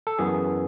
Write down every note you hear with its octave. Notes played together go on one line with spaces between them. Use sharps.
A4
F#2 E3 B3 G#4